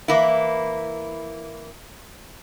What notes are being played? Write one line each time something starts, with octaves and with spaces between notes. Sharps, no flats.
E3 A#3 E4